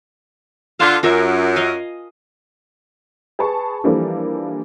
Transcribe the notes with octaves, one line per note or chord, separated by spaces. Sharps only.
D3 F4 F5 A5
F#2 F4 A#4 E5
D#5 F5 G#5
G#4 B4 A5 C#6
E3 F3 G3 A#3 D4 A4